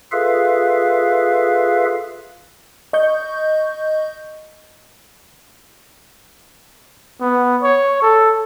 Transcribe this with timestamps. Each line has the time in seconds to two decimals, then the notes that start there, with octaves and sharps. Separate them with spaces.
0.12 F4 G#4 A4 B4 E5 F5
2.93 D#5 C#6 G6
7.21 B3
7.63 C#5
8.02 A4